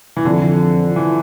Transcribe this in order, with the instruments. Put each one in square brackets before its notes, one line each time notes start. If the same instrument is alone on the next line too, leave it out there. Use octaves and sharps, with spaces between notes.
[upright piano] E3
[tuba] F2 [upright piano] D3
[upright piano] E3